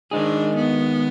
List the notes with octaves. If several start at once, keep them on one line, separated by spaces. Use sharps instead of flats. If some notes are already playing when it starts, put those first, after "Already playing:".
D#3 G#3 D4 D#4 G#4
B3